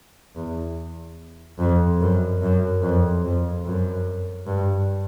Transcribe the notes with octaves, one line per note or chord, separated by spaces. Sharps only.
E2
F2
F#2
F#2
F2
F2
F#2
G2